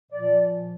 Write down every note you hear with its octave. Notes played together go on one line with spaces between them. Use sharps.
A#2 F3 D5